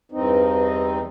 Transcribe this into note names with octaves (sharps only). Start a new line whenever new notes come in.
E2 G2 C4 D#4